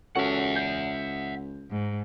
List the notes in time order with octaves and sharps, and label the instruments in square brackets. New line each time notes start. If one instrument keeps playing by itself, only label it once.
[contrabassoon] C#2 [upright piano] C#4 F#4 A4 [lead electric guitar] E5 F#5
[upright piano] G6
[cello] G#2